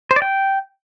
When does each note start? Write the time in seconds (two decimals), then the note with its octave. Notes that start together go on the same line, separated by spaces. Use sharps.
0.11 C5
0.16 D5
0.22 G5